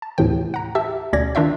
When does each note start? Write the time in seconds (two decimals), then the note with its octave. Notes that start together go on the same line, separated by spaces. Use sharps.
0.02 A5
0.18 D#2 A2 C3 E3 G5
0.54 F#5 A#5
0.75 G4 E5 G5 A5 E6
1.13 D2 B2 C#4 D5 G#6 A#6
1.35 D#3 D4 F4 E5 G5